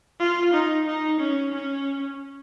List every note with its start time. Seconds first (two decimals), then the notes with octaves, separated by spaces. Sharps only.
0.20 F4
0.53 D#4
0.86 D#4
1.20 C#4
1.53 C#4